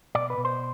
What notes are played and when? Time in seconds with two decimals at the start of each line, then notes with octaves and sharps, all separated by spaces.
0.15 B2 D5
0.30 B4
0.38 B2
0.45 C5